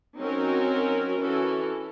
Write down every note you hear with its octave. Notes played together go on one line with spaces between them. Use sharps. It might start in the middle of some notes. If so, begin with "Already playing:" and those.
F#3 C4 C#4 D#4 F#4 A#4
E3 C#4 F#4 A4